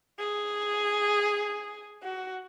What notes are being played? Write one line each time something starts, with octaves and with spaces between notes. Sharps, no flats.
G#4
F#4